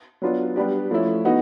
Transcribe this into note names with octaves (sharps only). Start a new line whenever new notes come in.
F#3 B3 D4 F4
G3 B3 D4 G4
F3 A3 C#4 E4
B3 D#4 F#4